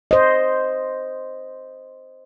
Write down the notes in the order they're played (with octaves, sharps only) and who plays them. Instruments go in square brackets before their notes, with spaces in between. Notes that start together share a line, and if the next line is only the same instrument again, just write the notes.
[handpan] C5 D#5